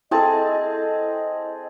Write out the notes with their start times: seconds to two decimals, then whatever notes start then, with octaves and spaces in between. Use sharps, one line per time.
0.11 C4 E4 G#4 A4 D#5 A5